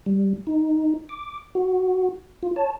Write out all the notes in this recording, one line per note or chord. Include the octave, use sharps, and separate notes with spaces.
G3
D#4
D6
F#4
F4
C#5 A5